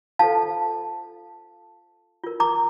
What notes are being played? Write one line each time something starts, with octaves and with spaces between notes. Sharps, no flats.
F4 A4 C5 F5 A5
F4 A#4
A#5 D6